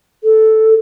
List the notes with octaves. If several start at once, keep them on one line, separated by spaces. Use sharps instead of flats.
A4